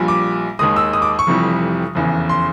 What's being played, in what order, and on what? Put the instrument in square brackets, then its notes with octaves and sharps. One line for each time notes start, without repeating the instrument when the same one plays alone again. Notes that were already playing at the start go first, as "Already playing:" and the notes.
Already playing: [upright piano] A#1 A#2 G3
D6
D#2 D#3 G#3 D#6
E6
D#6
D6
C#6
F1 F2 C3 E3 G3
F1 E2 C#3 E3
C6